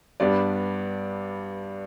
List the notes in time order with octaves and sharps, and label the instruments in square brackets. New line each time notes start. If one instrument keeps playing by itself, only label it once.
[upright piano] G2 G3 B3 D4 D5